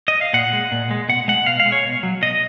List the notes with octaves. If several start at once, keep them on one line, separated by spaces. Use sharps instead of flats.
D#5
F5
A#2 F#5
G#3
A#2
G#3
B2 F#5
G#3 F#5
B2 F5
F5
G#3
C#5
B2
F#3
B2 D#5